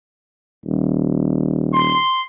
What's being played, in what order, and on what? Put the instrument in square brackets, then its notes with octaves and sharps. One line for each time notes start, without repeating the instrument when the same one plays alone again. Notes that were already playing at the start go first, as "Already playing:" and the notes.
[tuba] D#1
[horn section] C6